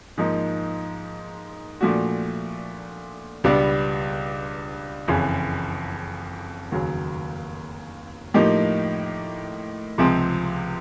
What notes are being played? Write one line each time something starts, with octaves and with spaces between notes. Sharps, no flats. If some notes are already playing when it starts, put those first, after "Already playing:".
G#2 F3 A#3 D#4
A#2 F3 A3 D4 F#4
C#2 B2 G3 B3 D4
F#1 F2 C#3 E3
F1 D#2 C#3 F#3
A2 F3 A#3 D#4 G4
C#2 C3 F3 G#3 C4